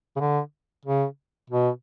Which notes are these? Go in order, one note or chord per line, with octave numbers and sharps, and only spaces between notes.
C#3
D3
C#3
B2